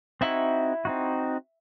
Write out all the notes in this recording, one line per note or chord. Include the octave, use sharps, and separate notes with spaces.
C4 D#4 E4 F#4
C4 D#4 F#4